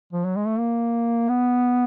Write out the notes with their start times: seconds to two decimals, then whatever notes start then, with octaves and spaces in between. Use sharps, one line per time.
0.13 F3
0.25 F#3
0.36 G#3
0.47 A3
0.59 A#3
1.29 B3